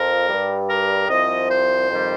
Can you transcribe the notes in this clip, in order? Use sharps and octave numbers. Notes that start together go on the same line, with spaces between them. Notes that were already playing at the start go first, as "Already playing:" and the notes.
Already playing: F2 F3 A#4
G2 G3
A#4
C2 C3 F3 D#5
C5
F2 C3 D#3 G3